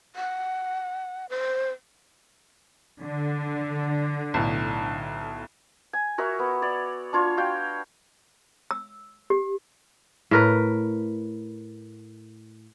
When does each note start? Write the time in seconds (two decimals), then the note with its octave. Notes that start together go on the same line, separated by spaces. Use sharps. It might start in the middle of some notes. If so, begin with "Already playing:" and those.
0.16 F#5
1.30 C5
3.01 D3
4.34 B1 A2
5.93 G#5
6.18 F#4 A#4 C#5 E5
6.39 B3
6.62 C#5 D5
7.13 D4 F4 C#5
7.37 F#4 F5 G5
8.71 E6
9.30 G4
10.31 A2 A#4 B4